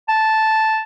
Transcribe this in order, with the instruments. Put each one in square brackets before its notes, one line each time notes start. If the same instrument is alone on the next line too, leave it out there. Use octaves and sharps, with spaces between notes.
[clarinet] A5